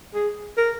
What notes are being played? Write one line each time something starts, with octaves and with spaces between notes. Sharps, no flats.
G#4
A#4